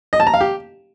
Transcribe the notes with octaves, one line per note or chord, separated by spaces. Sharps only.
D#5
A5
A#5
F5
G4